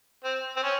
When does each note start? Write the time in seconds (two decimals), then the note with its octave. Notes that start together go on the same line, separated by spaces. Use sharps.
0.24 C4
0.56 C4
0.63 C#4